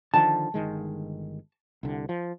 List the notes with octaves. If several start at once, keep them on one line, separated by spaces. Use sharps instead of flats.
D3 D#3 F3 A5
G1 D#3 G#3
C2 D3
F3